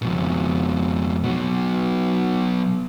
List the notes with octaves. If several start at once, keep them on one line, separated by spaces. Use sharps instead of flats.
F2 B2
B2 F#3